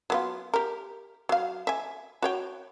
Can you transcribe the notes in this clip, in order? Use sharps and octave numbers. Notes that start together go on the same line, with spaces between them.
F#3 B3 F4
G4 A#4
F#3 F5
E5 G#5
F#4 C#5 G5